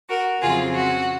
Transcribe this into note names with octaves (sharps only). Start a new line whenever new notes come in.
F#4 A#4
F2 C#3 F#3 C4 F4 G#4
F#4